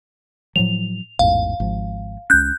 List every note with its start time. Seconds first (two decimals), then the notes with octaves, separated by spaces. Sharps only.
0.56 A2 F3 F#3 F7
1.19 A1 E2 G#2 F5
1.60 G#1 F3
2.30 C#2 C#4 F#6 G6